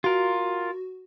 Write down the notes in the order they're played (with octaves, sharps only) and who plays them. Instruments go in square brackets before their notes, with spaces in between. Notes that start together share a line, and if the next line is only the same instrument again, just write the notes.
[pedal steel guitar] F4 A#4 [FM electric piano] F#4